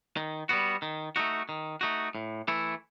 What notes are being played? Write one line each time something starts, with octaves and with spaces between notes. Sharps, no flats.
D#3
G3 B3 F#4
D#3
A3 D#4 F#4
D#3
A3 D#4 F#4
A2
E3 A3 E4